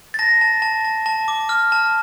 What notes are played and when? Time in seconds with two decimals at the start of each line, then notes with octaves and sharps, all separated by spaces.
0.14 A6
0.19 A5 A#6
0.41 A5
0.62 A5
0.85 A5
1.06 A5
1.28 D6
1.49 F6
1.72 A5